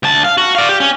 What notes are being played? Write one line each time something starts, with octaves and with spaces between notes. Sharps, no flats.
D2 A5
F5
F#4
D5 F5
G4
C#4